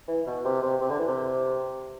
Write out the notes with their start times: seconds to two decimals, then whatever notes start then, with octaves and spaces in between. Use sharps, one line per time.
0.08 E3
0.27 B2
0.45 C3
0.62 C3
0.81 C3
0.90 D3
0.99 E3
1.08 C3